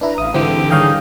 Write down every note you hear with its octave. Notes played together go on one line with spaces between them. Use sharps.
D4 E4 B4 A#5
A1 E5 F5 D#6
G#2 D3 E3 C4 G4
D#3 G3 D#4 G#4 C#5 F5 G5